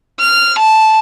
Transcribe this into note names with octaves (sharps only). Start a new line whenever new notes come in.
F6
A5